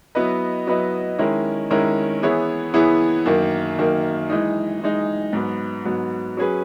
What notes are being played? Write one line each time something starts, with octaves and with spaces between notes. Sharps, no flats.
F#3 B3 E4 B4 D#5
F#3 B3 E4 B4 D#5
D#3 G#3 C#4 E4 A#4
D#3 G#3 C#4 E4 A#4
E3 B3 E4 G#4 C#5
E3 B3 E4 G#4 C#5
F#2 D#3 A#3
F#2 D#3 A#3
E3 G#3 D#4
E3 G#3 D#4
G#2 F#3 B3
G#2 F#3 B3
F#3 C#4 G#4 B4